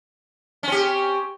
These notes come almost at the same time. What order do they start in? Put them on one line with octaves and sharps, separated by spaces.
C#4 C4 G4